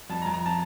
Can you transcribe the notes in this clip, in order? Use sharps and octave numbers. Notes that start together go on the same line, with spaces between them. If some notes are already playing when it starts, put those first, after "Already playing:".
F2 A5
A#5
F2
A#5
A5